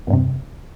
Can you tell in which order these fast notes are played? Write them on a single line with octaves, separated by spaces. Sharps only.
E2 G2 C3